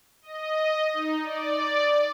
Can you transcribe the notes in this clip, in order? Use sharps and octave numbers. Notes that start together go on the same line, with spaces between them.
D#5
D#4
D5